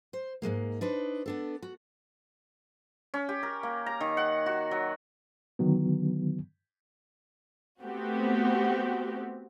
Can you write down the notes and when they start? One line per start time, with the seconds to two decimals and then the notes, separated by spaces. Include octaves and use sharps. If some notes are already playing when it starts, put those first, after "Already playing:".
0.13 C5
0.42 G#2 F3 G#3 A#3
0.81 D4 D#4 B4 C5
1.26 B3 D4 A4
1.62 F#4
3.14 C#4
3.29 G4
3.43 A#4
3.63 A#3
3.86 A#5
4.01 D#3
4.17 F#5
4.46 F#4
4.71 F#3
5.59 D3 D#3 F#3 B3
7.82 A3 B3 C4 F#4 G4